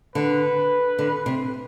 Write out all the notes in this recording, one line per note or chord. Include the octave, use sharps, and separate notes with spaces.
D3 B4
D3
C3